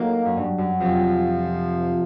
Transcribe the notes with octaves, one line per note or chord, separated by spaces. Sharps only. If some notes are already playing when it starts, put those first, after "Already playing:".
Already playing: A2 F#3 A#3 D#4
F#2
G2
F#2
F2 C3 F3